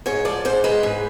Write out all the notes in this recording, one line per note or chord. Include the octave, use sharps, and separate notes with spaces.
G#2 C#5
F3 D5
G#2 C5
G#3 B4
G#2